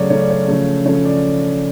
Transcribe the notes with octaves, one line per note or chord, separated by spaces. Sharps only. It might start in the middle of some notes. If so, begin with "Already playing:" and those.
Already playing: C#3 F#3 A3 C#4 C#5 D5
C#3 F#3 A3 C#4 C#5
D5
C#5
C#3 F3 A3 C#4
C#3 F3 A3 C#4 C#5
D5